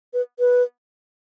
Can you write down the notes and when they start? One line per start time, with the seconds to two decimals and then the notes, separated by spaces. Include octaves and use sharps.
0.13 B4
0.39 B4